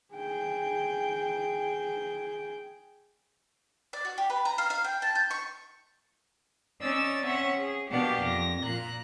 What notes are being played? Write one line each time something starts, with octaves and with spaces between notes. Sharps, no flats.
G#4 G5
D5
F#4
G4
B4
A#5
F5
F5
G5
A5
G6
C#6
C#4 D#4 D5 E6 A6
C4 C#4 C#5 E5 F#5
G#4
B2 A#3 D4 G4 F5 F#5
F2 A#6
A#2 A#5 F#6